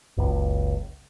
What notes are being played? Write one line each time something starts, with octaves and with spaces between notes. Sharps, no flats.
F#1 C#2